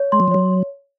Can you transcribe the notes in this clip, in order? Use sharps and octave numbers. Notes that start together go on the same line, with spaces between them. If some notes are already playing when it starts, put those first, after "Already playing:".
Already playing: C#5
G#3 C6
F#3
F3
F#3 C#5